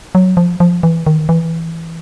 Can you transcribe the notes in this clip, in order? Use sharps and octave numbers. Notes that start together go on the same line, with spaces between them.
F#3
F3
F3
E3
D#3
E3